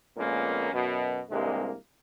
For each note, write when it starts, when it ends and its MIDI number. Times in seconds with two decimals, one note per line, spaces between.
0.17 0.72 41
0.17 0.72 46
0.17 0.72 56
0.17 0.72 58
0.17 0.72 59
0.17 0.72 61
0.73 1.20 42
0.73 1.20 47
1.30 1.73 36
1.30 1.73 43
1.30 1.73 48
1.30 1.73 51
1.30 1.73 56
1.30 1.73 58